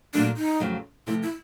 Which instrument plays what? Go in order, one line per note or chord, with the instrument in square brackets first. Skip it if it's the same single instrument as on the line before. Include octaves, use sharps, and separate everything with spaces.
[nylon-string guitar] A#2 F#3 A3 [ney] D4
[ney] D#4
[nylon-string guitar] F2 C#3 F#3 A3
[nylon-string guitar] C3 F3 A3 [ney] E4
[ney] E4